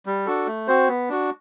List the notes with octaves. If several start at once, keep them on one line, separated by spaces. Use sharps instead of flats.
G3
D4 F#4 A4
A3
C4 F#4 C5
B3
D4 F#4